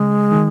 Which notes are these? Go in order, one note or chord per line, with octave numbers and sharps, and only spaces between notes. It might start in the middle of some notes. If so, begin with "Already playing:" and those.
Already playing: C#3 G#3
D#3